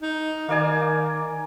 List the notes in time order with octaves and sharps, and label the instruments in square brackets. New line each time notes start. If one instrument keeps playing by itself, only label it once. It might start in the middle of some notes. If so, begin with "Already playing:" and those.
[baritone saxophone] D#4
[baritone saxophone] D#3 [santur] A#3 D5 G#5